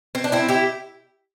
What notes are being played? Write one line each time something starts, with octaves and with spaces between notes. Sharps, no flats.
C4
D4
C4 E4
E4 G4